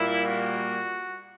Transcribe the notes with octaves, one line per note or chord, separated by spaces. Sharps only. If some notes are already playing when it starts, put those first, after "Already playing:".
Already playing: A#2 G3 A#3 E4
F#4